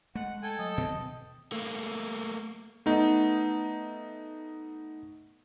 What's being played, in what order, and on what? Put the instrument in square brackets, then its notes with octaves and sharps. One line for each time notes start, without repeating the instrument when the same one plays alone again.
[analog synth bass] G#3 [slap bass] A3 [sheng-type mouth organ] F#5
[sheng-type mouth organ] A4 G5 [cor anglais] G#5
[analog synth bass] F#3 [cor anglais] D#5
[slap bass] B2 D#3 [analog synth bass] C4
[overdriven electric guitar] A3 A#3
[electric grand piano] A3 B3 D#4